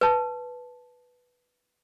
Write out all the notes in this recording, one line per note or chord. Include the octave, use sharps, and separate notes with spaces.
B4 A5